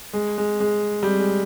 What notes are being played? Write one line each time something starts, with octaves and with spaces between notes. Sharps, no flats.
G#3
G#3
G#3
G3
G#3